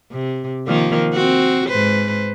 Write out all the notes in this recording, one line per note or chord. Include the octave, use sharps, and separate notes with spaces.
C3
D#3 F3 A#3
C4 F#4
G#2 B4 C5